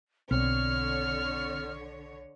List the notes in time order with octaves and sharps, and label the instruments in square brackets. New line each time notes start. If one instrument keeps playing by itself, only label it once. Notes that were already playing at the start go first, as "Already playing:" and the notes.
[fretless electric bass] B1 [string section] D3 C#5 [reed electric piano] C4 [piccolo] F6